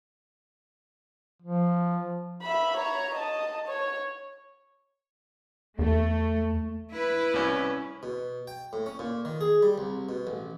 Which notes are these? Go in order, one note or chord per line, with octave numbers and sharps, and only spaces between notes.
F3
E5 B5
C#5 A#5
D#5 A5
C#5
E2 A3
E4 B4
C2 C#4
B2
G5
A2
C#4
A#2
D#3
G#4
G3
C2
B2
A1